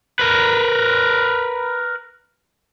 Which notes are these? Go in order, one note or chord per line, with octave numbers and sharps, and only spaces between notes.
A#4 B4